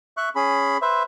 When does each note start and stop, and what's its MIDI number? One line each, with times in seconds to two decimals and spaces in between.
0.17 0.29 76
0.17 0.29 85
0.17 0.29 90
0.36 0.77 61
0.36 0.77 68
0.36 0.77 83
0.82 1.03 71
0.82 1.03 72
0.82 1.03 76